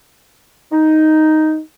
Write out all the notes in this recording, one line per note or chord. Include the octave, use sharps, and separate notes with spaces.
D#4